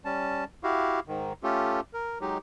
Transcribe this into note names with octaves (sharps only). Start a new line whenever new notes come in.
G3 C#4 A5
E4 F#4 G4 F5
G#2 D#3
A3 C#4 F4 G4 A4
A#4
F#3 G#3 D#4 G4